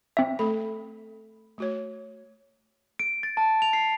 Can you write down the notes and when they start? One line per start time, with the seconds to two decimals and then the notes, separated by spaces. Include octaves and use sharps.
0.17 C4 E5
0.39 A3 A4 B5
1.58 A3 F#4 C#5
2.99 D7
3.23 A6
3.37 A5
3.62 F7
3.73 C7